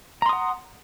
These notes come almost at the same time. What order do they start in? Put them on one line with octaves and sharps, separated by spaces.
A#5 C6 D#6 F#5